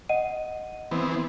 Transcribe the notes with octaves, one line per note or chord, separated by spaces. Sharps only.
D#5 F#5 D#7
E3 B3 C4